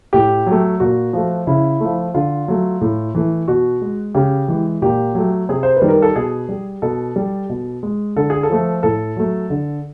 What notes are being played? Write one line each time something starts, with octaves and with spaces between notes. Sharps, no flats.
A2 G4
F#3 A3
A#2 F#4
F3 A3
C#3 E4
F3 A3
D3 F4
F#3 A3
A2
E3 A3
B2 F#4
G#3
C#3 G4
E3 G#3
A#2 G4
F#3 A3
C3 G#4
C5
B4
D#3 G3
A#4
A4
B2 G#4
G3
B2 A4
G3
B2
G#3
D3 A4
G#4
A4
F3 A3
A2 A4
F#3 A3
D3